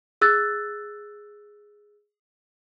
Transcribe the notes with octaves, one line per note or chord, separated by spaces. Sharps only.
G#4 E6 F#6 A6